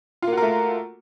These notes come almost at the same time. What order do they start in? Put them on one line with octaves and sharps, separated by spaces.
F4 A#3 F#4 A#4 A3